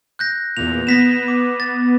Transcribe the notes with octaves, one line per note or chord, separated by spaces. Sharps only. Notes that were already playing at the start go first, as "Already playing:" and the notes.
F#6 G6 A#6
E2 A#2 F7
B3 A#6 B6 E7
D6
A6